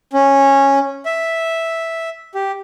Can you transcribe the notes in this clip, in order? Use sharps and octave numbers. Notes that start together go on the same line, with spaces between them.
C#4
E5
G4